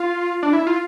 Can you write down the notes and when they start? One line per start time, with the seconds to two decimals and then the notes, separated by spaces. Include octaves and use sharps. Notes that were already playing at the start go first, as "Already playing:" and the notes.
Already playing: F4
0.43 D4
0.53 E4
0.67 F4